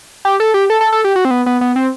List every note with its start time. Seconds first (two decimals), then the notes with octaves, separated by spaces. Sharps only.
0.25 G4
0.40 A4
0.54 G4
0.70 A4
0.81 A4
0.92 A4
1.04 G4
1.16 F#4
1.25 C4
1.31 B3
1.46 B3
1.61 B3
1.76 C4